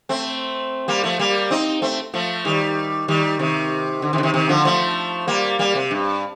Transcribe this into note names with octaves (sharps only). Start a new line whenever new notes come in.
A3 C4
G3 A#3
F3 A3
G3 A#3
C4 D#4
A3 C4
F3 A3
D#3 G3
D#3 G3
C3 D#3
D3
C3 D#3
D3
C3 D#3
C3 D#3
D3 F3
F3 A3
G3 A#3
G3 A#3
C3
G2